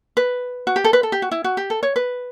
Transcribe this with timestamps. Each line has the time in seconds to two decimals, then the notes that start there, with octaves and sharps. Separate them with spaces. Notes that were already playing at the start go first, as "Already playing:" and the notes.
0.17 B4
0.67 F#4
0.76 G4
0.84 A4
0.93 B4
1.03 A4
1.12 G4
1.22 F#4
1.31 E4
1.44 F#4
1.57 G4
1.70 A4
1.83 C#5
1.96 B4